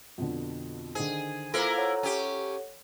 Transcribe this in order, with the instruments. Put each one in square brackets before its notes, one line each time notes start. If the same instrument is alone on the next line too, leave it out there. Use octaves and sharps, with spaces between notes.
[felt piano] F2 B2 D3
[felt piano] D3 D#3 [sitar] G#4 [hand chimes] C5
[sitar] A#3 E4 A#4 [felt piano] F4 [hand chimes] A4 C5
[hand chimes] A4 C#5 F#5
[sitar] C#4 G4